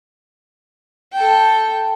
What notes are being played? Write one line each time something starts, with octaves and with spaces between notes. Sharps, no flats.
A4 G5